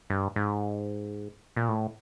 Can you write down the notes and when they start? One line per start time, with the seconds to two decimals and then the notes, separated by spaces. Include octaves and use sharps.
0.10 G2
0.36 G#2
1.56 A#2
1.69 A2